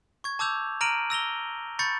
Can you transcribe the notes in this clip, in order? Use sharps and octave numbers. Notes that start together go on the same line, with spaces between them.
C#6 G#6
A5 D6 E6 G6 F7
A#5 F6 A#6 D7 D#7 F#7
E6 A#6 F7 G7
B5 C#6 G6 A6 C#7